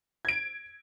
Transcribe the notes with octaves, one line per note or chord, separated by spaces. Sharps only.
G#6 D7